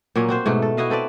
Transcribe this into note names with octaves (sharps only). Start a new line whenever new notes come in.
A#2 F#3 A#3 C#4
C4 F#4 C5
G#2 B2 A3 D#4
A4
E4 F#4 D#5 F5
C4 A4 B4 D5